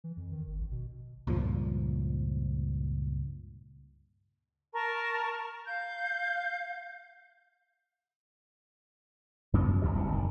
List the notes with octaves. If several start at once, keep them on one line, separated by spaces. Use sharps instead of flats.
E3
F2
D#3
G#1
A#1
B2
C#2 G2 A#2 F3
A#4 A5 A#5 C#6
F5 G6
F#2 C#3 F3 B3
F#2
A1 D2 B2 G3
D1 C2 B2
F#1 D#3